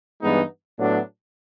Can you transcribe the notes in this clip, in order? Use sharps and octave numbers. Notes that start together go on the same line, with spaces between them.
G2 E3 G#3 B3 D#4
A2 F#3 B3 D4